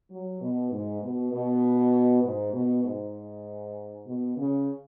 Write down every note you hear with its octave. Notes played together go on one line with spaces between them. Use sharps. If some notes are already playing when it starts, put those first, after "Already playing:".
F#3
B2
G#2
B2
B2
G#2
B2
G#2
B2
C#3